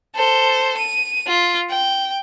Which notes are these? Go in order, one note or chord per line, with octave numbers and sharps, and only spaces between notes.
A4 C5
D#7
F4
G5